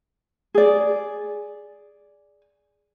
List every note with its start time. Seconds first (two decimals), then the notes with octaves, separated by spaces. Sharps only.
0.54 G#4 D5